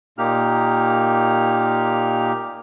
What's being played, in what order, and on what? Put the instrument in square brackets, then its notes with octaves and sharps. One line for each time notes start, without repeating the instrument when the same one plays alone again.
[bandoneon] A#2 A#3 D#4 G4 F6